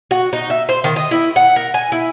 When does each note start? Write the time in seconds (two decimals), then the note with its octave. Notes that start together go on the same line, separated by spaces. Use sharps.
0.11 F#4
0.33 D#4
0.50 E5
0.69 C5
0.84 D#3
0.96 D#5
1.11 E4
1.36 F#5
1.56 A#4
1.74 G#5
1.92 E4